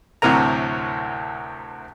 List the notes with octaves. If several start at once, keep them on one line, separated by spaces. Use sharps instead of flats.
D2 A2 C3 F#3 A#4 A#5